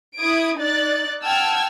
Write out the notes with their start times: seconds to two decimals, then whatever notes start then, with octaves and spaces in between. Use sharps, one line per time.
0.16 E4 D#6 G#6 D7
0.59 D#4 D5 F#6 A6
1.23 F#5 G5 A5 E6 F6 G#6